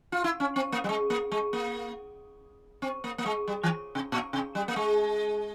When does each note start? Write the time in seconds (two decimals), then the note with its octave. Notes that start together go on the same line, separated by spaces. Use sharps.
0.12 F4
0.24 E4
0.40 C#4
0.56 C4
0.72 A#3
0.84 G3
0.89 G#3
1.10 A#3
1.32 G#3
1.53 A#3
2.82 C4
3.04 A#3
3.18 A#3
3.26 G#3
3.48 G3
3.63 E3
3.95 C3
4.12 A#2
4.33 C3
4.55 G3
4.68 A#3
4.76 G#3